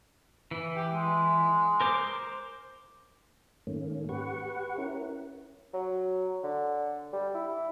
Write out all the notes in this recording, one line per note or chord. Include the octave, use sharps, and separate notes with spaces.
E3
G4
G#3
A#4 C5 D6
G#2 D#3 A3 A#3 C#4
G4 B4 F#5 C#6
C#4 E4 A#4
F#3
D3
G3
E4